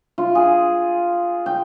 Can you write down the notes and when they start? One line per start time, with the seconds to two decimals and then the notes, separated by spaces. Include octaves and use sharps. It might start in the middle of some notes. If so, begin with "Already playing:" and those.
0.18 F4
0.35 G#4
1.46 G5